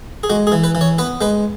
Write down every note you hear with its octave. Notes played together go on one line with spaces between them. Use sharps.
G#4
G#3 F#4
G#4
E3
B4
E3
C#5
B3 B4
G#3 B4